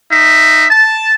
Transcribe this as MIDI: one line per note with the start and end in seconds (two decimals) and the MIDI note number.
0.11 0.66 63
0.11 0.66 76
0.70 1.13 81